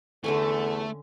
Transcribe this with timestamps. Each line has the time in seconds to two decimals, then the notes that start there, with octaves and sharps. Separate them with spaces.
0.24 E2 D3 A3 C#4 A4 G#5